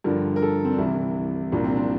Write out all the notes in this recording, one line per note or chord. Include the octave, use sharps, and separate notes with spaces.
G2 D3 F3 A#4
A#4
A4
C4
D4
C2 C3 E3 E4
C2 A#2 F3 D4
C4
D4